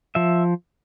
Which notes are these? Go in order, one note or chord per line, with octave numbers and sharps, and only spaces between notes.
F3 E5